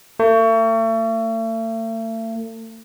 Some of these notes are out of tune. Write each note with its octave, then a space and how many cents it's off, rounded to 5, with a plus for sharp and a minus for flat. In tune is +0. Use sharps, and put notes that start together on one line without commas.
A3 +40